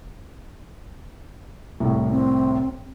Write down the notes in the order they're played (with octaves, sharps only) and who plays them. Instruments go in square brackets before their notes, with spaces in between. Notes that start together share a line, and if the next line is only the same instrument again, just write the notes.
[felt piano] C2 A2
[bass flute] C4